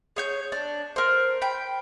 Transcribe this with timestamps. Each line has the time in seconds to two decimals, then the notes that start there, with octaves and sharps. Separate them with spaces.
0.16 G#4 C#5 G6
0.52 D4
0.96 A#4 C5
1.42 G5 B5